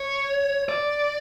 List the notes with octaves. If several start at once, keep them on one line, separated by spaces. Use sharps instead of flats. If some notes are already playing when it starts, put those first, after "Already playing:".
Already playing: C#5
D5